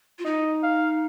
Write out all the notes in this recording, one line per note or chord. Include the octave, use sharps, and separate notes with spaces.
F4
D#4 D#5
F5